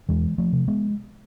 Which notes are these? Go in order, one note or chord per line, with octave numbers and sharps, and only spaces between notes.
E2 E3 G#3
F3 A3
C3
G#3 B3